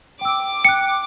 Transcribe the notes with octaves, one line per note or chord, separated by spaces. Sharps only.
G5 D6 E6
G5 F#6 C#7